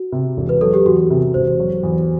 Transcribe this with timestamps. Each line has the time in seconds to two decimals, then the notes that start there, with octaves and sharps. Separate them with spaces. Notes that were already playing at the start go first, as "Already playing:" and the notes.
Already playing: F#4
0.12 C3
0.37 E1
0.49 B4
0.61 F#3 A4
0.74 G4
0.85 E2 F#4
1.10 C3
1.34 E1 C5
1.60 F#3
1.83 E2